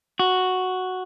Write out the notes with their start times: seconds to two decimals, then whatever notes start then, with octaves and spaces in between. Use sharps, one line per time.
0.19 F#4